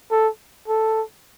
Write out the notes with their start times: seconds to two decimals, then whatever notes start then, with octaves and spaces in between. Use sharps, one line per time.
0.11 A4
0.68 A4